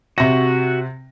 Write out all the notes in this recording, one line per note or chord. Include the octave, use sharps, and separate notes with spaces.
C3 F#4 A#6